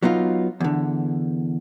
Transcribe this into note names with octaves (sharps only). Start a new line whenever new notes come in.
F#3 B3 D#4 F4
E2 D3